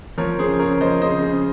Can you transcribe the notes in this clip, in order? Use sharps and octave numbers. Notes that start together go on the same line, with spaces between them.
F3 A#4 C#5
C#3 G#4 C5
C#3 A#4 C#5
F3 C5 D#5
C#3 C5 D#5
C#3